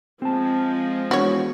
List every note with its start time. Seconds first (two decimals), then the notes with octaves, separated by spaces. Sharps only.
0.22 F3 G#3 C4 A5
1.11 E1 F#4 C#5